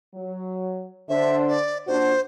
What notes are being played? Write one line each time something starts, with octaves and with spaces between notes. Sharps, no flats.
F#3
D3 D4 C5 E5
D5
A#2 D4 F#4 C5